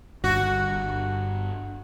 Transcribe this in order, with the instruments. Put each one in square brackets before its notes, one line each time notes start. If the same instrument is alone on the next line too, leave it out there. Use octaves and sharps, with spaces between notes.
[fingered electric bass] G1 G2 [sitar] F#4